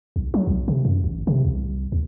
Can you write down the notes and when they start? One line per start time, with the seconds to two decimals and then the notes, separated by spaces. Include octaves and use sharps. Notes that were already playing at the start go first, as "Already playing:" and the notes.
0.16 B1
0.34 F#3
0.47 B1
0.68 C3
0.85 F#2
1.04 A1
1.27 C3
1.45 C2
1.92 D2